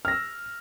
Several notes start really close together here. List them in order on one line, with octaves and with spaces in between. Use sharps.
F6 A#6 E6